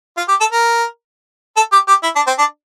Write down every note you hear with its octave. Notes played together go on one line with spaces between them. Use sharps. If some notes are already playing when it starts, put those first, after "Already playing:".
F4
G4
A4
A#4
A4
G4
G4
E4
D4
C4
D4